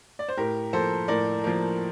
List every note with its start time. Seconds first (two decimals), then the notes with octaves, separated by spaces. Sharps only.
0.19 D5
0.29 C5
0.37 A2 G4 A#4
0.73 F3 A#3 A4 C5
1.08 A2 A#4 D5
1.44 F3 A#3